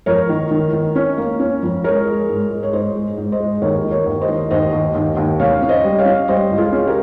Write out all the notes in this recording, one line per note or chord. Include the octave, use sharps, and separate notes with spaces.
F2 A#4 C#5
D#3
D#3
D#3
C#4
A#3
C#4
F2
G#3 A#4 C#5
G#3
G#2
G#3
C#5
G#2 C5 D#5
G#3
G#2
C5 D#5
G#3
D#2 A#4 C#5
D#3
A#4 C#5
D#2
C5 D#5
D#3
D#2 C5 D#5
D#2
D#2
D#2
C#3 C#5 F5
C#4
C5 D#5
G3
C#5 F5
C#4
G3 C5 D#5
C#2
F4 G#4
C#4
G4 A#4